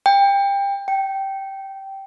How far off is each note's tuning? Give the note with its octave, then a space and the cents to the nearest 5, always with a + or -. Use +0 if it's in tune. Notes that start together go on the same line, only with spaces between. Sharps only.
G5 +25
G5 -10